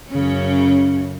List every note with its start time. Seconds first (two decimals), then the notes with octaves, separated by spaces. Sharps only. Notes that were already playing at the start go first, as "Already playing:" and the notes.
0.10 F#2 C#3 C#4